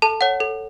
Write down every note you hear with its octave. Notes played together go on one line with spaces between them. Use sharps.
A4 A5
C#5 F#5
A4